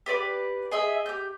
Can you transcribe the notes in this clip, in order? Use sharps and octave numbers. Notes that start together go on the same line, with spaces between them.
G4 B4 D5 D6
G#4 D#5 E5
G4 G6